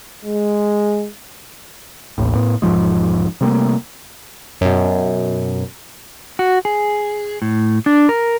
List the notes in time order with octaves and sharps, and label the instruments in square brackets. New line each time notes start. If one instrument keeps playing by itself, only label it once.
[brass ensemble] G#3
[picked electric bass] A1 D#2 A2
A2 B3
E1 G#2 F3 G#3
C3 G3 A3 A#3
[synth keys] F#2 B2
[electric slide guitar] F#4
G#4
A2
D4
A#4